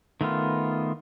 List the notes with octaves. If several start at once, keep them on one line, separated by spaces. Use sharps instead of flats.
D#3 A3 B3 F4